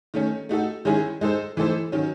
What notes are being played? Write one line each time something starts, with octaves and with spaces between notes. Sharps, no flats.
D#3 A3 C#4
A3 D#4 F#4 A4
D#3 G#3 C#4 E4 G#4
G#3 D#4 A4 C5
E3 A3 D#4 A4 C5
D#3 F#3 C#4